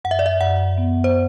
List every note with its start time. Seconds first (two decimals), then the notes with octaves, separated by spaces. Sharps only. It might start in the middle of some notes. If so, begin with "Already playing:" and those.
0.05 F#2 F#5
0.11 E5
0.19 D5
0.26 E5
0.41 F#2 F#5
0.78 B3
1.04 C5